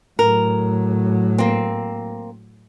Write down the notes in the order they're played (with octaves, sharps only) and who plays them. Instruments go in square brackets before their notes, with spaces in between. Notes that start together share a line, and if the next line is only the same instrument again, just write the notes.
[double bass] A2 F#3 [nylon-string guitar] A#4
[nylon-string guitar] A#3 C4